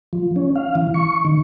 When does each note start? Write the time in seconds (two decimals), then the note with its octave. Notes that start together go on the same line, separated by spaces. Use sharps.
0.13 F3
0.36 C#4
0.56 F5
0.75 E3
0.94 C#6
1.25 D#3